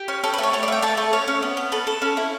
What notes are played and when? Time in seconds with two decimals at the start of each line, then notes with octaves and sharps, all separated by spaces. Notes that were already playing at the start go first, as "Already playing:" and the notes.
Already playing: G4
0.08 C#4
0.24 C#4 A4
0.34 B4
0.38 A3 C#5
0.53 A3 C#5
0.63 D5
0.68 A3 G5
0.82 A3 A5
0.97 A3
1.13 C#4 C#5
1.28 C#4
1.42 B3
1.57 B3
1.72 A4 B4
1.87 A4
2.02 C#4
2.17 E4